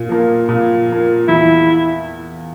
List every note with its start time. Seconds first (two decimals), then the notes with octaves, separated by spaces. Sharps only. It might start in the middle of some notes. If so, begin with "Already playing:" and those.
Already playing: A#2
0.09 F3 A#3
0.49 A#2
0.89 F3 A#3
1.28 E2 E4